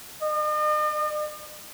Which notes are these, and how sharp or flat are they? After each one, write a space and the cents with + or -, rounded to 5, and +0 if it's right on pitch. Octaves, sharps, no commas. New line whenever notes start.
D#5 -45